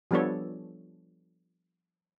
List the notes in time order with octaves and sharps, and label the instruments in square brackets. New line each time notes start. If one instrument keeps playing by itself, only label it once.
[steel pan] F3 G3 B3 D4 A4 C#5